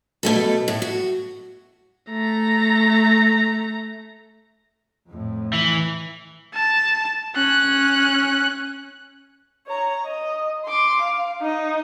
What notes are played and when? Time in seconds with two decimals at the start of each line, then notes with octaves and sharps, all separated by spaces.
0.23 B2 A3 A4
0.68 A2
0.82 F#4
2.10 A3 A#5
5.08 F2 A2
5.53 E3
6.54 A5
7.36 C#4 F#6
9.67 C#5 A#5
10.06 D#5
10.66 C6 D6
11.02 F5
11.42 D#4 D#5